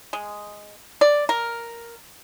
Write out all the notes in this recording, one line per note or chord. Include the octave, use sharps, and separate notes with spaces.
G#3
D5
A#4